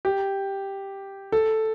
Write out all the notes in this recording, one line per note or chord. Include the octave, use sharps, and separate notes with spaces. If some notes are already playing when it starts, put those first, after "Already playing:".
G4
A4